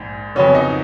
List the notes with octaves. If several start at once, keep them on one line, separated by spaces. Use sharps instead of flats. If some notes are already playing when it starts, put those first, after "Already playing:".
Already playing: A#1 G#2
F2 C#3 F#3 B3 C#4 C#5
D#4 D#5